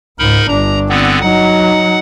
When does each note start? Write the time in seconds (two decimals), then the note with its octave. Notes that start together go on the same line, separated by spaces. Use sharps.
0.19 C#2 G#2 D#4 A#4 B5
0.48 G1 D4 A#5
0.89 D3 B3 C4
1.21 F#3 D#4 F#5